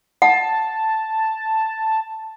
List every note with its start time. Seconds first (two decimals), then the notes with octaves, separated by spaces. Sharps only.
0.22 F#5 A5